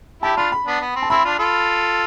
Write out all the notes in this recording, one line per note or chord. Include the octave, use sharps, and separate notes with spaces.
E4 G4 A5
D4 F4 B5
B5
B3 D4
B3
C4
A5
C4 E4 B5
D4 F4
F4 A4